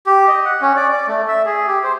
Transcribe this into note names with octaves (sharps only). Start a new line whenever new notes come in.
G4
D#5
F#5
C#4
D5
D5
A3
E5
G#4
G4
C5